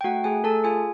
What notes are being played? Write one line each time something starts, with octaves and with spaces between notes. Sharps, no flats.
G5
A3 F#4 F#5
A3 G#4 G#5
A3 A4 A5
F4 G#4 G#5